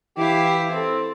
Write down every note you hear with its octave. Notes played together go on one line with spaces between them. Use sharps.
E3 E4 G4 F5
C4 A4